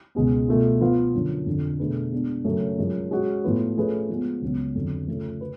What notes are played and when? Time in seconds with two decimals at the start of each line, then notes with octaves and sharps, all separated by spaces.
0.15 C#2 B2 G#3 B3
0.48 B2 A3 F4
0.81 F3 B3 F4 B4 F5
1.14 F#2 D3 F3
1.46 F2 D3 F3
1.79 B2 A3 D4 G#4 B4
2.12 G#3 B3 D4
2.45 F#2 C#3 F#3 A3
2.78 F#2 F3 G#3
3.11 G#3 C#4 F#4
3.44 A2 F3 B3 F4 B4
3.77 F3 A3 C#4 G#4 B4
4.09 F3 G#3 B3
4.42 C#2 C#3 F#3 B3
4.76 F2 D3 F#3
5.08 C#3 F3 A3
5.41 B4